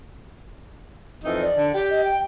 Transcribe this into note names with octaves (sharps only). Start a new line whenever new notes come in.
F2 E3 D#4
D5
D3
G4
D#5
G5